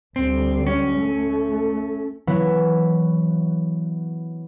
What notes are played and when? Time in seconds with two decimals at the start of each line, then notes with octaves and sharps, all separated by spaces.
0.16 D2 G3 C4
0.67 C#4
0.98 A3
2.27 E3 F#3 B3 E4